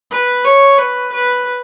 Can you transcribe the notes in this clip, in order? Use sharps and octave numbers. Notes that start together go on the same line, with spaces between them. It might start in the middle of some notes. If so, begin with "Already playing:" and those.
B4
C#5
B4
B4